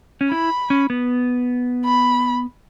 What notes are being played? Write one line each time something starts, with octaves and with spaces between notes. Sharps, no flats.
C#4
E4 B5
C#4
B3
B5